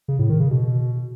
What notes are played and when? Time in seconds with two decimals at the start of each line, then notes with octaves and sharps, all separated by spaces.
0.08 C#3
0.19 A2
0.29 D#3
0.40 C#3
0.51 B2